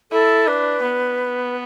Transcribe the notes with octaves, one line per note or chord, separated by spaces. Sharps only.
E4 A4
D4 B4
B3